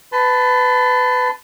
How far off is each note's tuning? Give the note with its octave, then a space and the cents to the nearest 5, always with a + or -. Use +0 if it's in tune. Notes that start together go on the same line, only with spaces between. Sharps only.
B4 +20 A5 +0 C6 -30